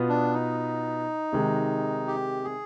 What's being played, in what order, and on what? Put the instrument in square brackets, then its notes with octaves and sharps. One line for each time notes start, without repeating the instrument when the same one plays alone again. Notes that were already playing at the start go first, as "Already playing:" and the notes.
Already playing: [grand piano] B2 B3 F4 B4
[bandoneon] D4
D#4
[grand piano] C3 D#3 G#3
[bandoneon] G4
G#4